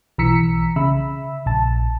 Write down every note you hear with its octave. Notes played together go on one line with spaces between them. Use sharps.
B1 E3 A#5 E6 B6 C#7
C#3 E5 B5 E6
A#1 A5